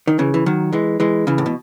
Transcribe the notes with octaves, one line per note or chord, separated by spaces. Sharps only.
D#3
C#3 E3
E3
D#3 F#3
E3 G#3
E3 G#3
C#3 E3
A2
B2